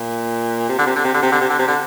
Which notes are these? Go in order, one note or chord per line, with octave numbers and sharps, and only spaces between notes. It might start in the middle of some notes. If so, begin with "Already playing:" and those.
Already playing: A#2
C3
D3
C3
D3
C3
D3
C3
D3
C3
D3
C3
D3